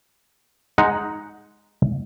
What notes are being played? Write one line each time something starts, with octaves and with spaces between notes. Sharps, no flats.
G#3 D#4 F#5 A#5